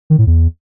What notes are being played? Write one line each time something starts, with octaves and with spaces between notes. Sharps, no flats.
D#3
A2
E2